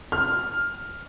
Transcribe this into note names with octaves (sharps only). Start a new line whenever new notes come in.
F6